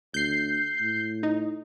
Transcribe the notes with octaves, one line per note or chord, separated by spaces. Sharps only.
D2 G6 C7
A2
D#4